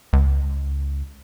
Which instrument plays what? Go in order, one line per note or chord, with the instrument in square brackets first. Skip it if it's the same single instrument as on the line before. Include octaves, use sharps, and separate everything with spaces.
[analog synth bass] C#2